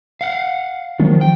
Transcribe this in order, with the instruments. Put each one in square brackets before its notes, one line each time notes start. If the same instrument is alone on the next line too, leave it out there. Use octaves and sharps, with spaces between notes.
[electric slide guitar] F5 F#5
[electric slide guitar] D#3 [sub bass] F3
[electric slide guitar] G5